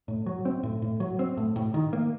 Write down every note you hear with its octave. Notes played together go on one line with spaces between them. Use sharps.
A2
F#3
C4
A2
A2
F#3
C4
A2
A2
D#3
A#3